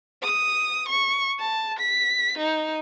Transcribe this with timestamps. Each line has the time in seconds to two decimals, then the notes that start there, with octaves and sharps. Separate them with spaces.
0.23 D#6
0.89 C#6
1.40 A5
1.80 B6
2.38 D#4